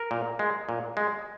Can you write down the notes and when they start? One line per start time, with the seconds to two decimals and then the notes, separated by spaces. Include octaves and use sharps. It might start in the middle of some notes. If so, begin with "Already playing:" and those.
Already playing: A#4
0.11 A#2
0.39 G#3
0.69 A#2
0.97 G#3